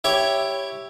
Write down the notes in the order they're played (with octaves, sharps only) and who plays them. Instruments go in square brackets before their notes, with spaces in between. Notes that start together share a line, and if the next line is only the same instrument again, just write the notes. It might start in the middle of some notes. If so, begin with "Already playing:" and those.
[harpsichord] E4 G4 C#5